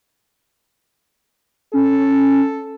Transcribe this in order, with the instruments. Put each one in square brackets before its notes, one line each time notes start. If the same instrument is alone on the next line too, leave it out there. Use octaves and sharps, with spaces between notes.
[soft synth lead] C#4 [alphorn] A4